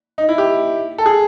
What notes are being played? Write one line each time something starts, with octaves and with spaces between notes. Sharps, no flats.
D#4
E4
G4
A4
G#4